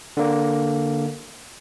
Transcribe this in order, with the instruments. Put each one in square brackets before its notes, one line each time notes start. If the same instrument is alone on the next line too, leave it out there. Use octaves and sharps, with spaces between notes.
[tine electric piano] D3 A#3